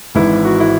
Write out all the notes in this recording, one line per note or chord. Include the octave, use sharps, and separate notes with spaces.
G#1 G#2 E3 E4
F#4
E4